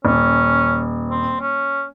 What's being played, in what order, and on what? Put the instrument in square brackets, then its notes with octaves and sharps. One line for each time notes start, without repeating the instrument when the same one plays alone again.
[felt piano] D#1 [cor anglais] C#4
[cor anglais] C4
C#4